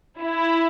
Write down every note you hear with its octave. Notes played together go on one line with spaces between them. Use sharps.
E4